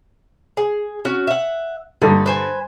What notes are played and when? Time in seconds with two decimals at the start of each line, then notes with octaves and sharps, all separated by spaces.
0.57 G#4
1.05 C#4 F#4
1.27 E5 F#5
2.02 G2 D3 D#4
2.26 B4 C5 G#5